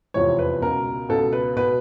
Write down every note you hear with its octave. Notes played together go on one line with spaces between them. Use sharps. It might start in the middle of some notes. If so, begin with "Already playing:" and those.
F1 E2 C3 F3 C#5
B4
C#2 B2 A#4
C#2 B2 A4
B4
B2 B4